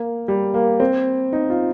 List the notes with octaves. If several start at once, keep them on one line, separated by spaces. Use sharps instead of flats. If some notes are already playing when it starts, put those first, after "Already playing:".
Already playing: A#3
G3
A#3
C4
D#4
F4